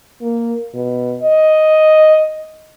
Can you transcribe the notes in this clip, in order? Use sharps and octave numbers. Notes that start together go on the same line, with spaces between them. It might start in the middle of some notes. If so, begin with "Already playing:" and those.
A#3
B2
D#5